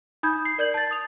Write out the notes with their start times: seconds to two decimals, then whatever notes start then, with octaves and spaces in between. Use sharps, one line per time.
0.23 D#4 B5 D#6 G6 G#6
0.45 C7
0.58 A#4 D5 G6 G#6 F#7
0.74 A5 A6
0.91 D#6 F7